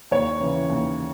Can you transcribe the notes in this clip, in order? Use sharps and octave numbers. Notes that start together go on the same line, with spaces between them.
D#2 C#5
C#3 E3
D#2